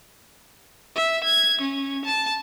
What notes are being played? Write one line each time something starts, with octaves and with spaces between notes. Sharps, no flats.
E5
G#6
C#4
A5